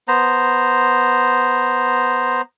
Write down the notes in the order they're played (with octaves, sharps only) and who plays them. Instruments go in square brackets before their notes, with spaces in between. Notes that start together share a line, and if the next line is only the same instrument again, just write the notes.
[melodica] B3 C5 A#5